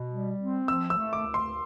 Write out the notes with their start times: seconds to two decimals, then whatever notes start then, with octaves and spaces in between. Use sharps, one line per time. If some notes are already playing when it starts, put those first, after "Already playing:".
Already playing: B2
0.10 G3
0.39 C4
0.68 F3 E6
0.90 E6
0.97 A3
1.13 D6
1.27 D2
1.34 C6